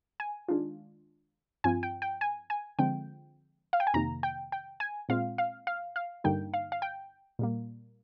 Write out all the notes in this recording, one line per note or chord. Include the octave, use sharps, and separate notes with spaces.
G#5
D#3 G#3 D4 F4
G2 F3 C4 F4 G#5
G5
G5
G#5
G#5
D3 F3 G#3 C4 G5
F5
G5
G#5
F2 C3 D#3 A#3 A#5
G5
G5
G#5
A#2 G#3 C4 F4 F5
F5
F5
F5
G2 D3 G3 A#3 D#4 G5
F5
F5
G5
A#2 G3 A#3